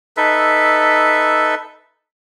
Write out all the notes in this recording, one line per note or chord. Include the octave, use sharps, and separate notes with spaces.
D#4 A4 B4 E5